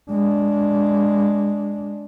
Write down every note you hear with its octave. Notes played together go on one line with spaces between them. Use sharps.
G#3 D4